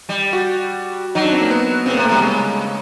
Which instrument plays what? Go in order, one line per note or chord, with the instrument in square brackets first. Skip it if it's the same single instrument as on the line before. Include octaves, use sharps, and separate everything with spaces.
[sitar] G3
[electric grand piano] F#4
[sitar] F#3 [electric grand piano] D#4
[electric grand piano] D4
C4
A#3
B3
[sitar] C#3 [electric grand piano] B3 C4
[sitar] C3 [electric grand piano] A#3
[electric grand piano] A3
[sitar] C3 [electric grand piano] G3
[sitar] C#3 [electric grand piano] G#3